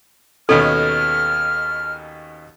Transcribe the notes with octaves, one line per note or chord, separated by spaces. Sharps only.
D#2 B2 C#4 A4 F6